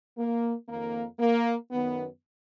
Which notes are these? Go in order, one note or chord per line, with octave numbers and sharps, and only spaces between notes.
A#3
F2 D#3 A#3
A#3
F#2 D#3 B3